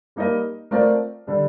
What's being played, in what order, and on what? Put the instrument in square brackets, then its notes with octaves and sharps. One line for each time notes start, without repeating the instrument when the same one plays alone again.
[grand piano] G3 A#3 D#4 A#4 D#5
A3 C4 F4 A#4 D5
D3 G3 D4